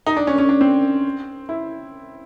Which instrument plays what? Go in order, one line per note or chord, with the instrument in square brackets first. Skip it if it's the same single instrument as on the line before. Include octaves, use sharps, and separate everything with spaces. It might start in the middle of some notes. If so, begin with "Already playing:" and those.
[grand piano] D#4
D4
C#4
C#4
D4
C4
E4